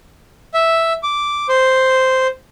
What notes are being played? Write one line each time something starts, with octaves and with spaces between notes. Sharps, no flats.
E5
D6
C5